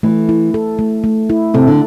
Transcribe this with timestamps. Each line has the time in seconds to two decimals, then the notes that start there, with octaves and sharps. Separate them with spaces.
0.03 E3 A3
0.29 E4
0.54 A4
0.79 A3
1.04 A3
1.30 E4
1.54 C3 A4
1.67 D3